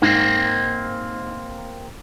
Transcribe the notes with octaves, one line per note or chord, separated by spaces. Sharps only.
G#2 A#3 C4